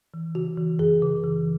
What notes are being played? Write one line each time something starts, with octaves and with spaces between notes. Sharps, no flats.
E3
C#3 F#4
E3
F#2 G#4
C#3
E3